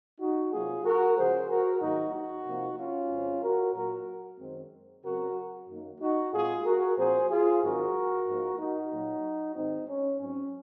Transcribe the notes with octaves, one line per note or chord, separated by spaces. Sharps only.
D#4 F#4
C3 F#3 A#3 F4 G#4
F#4 A#4
C#3 F3 G#3 G#4 C5
F#4 A#4
G#2 D#3 F#3 A#3 D#4 F#4
D#4 F#4
C3 F3 A#3
C#4 F4
F2 C#3 G#3 C4
F#4 A#4
A#2 F#3 A#3 F#4 A#4
F#2 D#3 G#3 C4
C#3 F#3 C4 F#4 A#4
F#2 D#3 A#3
D#4 F#4
A#2 G#3 C4 F4 G#4
F#4 A#4
A#2 F3 C4 G#4 C5
F4 G#4
G#2 D#3 F#3 C4 F#4 A#4
G#2 F3 A#3
D#4 F#4
A#2 F#3 A#3
G#2 D#3 G#3 C4 D#4
C#4
G#2 F#3 C4 C#4